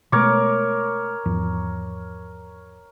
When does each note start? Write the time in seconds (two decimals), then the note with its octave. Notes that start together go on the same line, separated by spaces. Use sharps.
0.12 B2 G#3 A3 A#4 C#5 D6
1.26 E2 G#2 F3